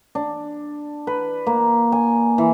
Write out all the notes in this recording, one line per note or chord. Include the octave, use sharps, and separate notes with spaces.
D4
B4
A#3
G#5
E3